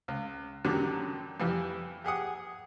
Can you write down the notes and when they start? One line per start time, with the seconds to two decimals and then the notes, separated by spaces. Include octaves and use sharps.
0.08 C#2
0.65 F#2 D3 D#3 F#3 G3
1.40 F2 E3 G3
2.04 G4 G#4 F#5 D#6